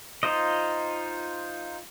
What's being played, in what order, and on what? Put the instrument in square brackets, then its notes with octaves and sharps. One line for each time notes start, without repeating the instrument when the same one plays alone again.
[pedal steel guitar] D#4 F4 C5 D#5